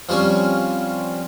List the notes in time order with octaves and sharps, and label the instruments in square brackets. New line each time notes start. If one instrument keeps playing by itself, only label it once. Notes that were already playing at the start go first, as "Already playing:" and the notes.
[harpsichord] F3 G3 C4 C#4